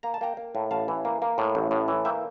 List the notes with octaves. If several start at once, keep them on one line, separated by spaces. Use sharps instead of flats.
A#3 A#5
A5
A#3 G5 A#5
A#3
A2
A1 F5 A5
E3
A#3
A#3
A2
A1
A2
E3
A#3 E5 G5